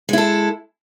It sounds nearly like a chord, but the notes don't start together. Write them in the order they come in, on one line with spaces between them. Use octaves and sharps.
G#3 E4 A4